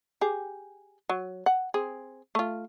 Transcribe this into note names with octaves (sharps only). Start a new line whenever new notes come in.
G4 G#4
F#3
F#5
C4 G#4
A3 F4